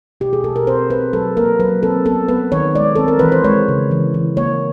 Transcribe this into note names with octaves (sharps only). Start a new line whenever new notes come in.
B2 G4
G#4
B2 A4
A#4
C4 C5
C4 B4
F#3 A4
A#3 A#4
F#3 B4
C4 A4
B3 A4
B3 B4
D#3 C#5
G#3 D5
C4 A4
A#4
E3 B4
C5
G#3 C#5
C#3
E3
E3
A#3 C#5